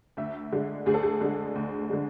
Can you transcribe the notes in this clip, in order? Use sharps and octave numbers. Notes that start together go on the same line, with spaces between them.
D2 E5
D3 G#3
D2 G#4
A4
G#4
D3 G#3
D2
D3 G#3